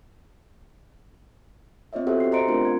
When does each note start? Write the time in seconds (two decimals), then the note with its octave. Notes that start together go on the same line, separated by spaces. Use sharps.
1.93 B3 C4 F4 C#5 D#5 E5
2.07 F#4 G4 A4 C5 E5 F#5
2.20 G4 C7
2.32 C5 D#5 A#5 C6 C#7 D7
2.47 A3 B3 C4 D4 F4 A#4
2.61 F#5 G#6